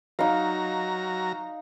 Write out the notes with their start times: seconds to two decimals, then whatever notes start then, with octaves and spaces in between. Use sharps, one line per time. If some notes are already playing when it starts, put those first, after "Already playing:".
0.19 F#3 D#4 F5 A#5